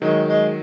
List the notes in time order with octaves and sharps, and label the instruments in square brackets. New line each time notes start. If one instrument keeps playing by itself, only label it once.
[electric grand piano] D#3 F#3 [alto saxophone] G#3
[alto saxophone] G#3